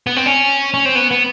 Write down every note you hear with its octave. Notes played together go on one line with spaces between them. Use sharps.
B3
C4
C#4
C#4
C4
B3
B3